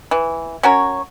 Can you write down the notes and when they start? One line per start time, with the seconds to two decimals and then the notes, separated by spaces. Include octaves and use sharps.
0.11 E3
0.63 C#4 F#4 A#4 C#5